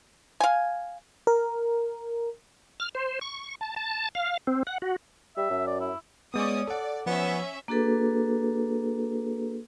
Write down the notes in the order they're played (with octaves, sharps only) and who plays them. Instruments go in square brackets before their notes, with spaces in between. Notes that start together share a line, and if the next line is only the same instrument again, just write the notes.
[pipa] F5 G#5
[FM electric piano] A#4
[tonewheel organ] F6
C5
C#6
A5
A5
F5
C4
F#5
F#4
[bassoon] G3 [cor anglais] E5
[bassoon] F#2
[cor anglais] D5
E4
[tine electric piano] G#3 B3 [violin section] C#4 D5 D#6
[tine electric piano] A4 F#5 [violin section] D5
[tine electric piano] F3 [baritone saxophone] B3 [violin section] C#4 E5
[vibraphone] A#3 D4 F#4 G#4 A4 B4